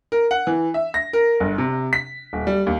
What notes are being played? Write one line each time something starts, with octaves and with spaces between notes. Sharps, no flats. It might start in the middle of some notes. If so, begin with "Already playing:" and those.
A#4
F#5
E3
E5
A#6
A#4
G1
C3
B6
D#1
G3
D#2